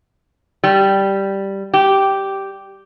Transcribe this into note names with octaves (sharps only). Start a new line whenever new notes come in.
G3
G4